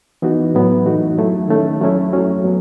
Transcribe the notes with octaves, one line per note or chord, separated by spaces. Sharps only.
E3 B3 D#4 F#4
A2 F#3 B3 E4
E3 A3 D#4 F#4
F#3 A3 E4
D#3 A3 C#4 E4
F#3 A3 C#4 E4
F#3 C#4 F#4
F#3 B3